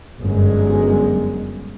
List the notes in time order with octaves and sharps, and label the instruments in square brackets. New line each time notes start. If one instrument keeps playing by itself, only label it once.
[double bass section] G1 F#2 G#3